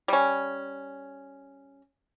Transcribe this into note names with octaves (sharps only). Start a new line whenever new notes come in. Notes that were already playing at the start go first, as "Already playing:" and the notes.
G3 C#4